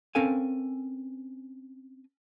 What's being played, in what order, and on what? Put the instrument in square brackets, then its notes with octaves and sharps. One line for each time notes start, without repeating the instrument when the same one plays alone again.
[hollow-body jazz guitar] C4 C#4 A4 A#4 F5 G#5